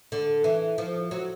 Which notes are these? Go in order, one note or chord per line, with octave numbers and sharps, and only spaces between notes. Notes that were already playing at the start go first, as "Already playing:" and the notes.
D3
E3
F3
F#3